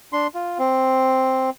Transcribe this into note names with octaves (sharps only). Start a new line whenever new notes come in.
D4 C6
F4
C4